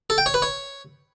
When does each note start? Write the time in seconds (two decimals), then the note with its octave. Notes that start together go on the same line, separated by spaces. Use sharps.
0.10 A4
0.18 G5
0.26 C#5
0.34 B4
0.42 C#5